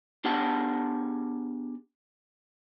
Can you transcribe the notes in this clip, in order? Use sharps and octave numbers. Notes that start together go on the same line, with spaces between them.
B3 D4 G4 G#4 F#5 A5